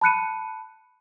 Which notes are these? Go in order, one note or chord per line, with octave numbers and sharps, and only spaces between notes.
A5 B5 F#6 C#7 D#7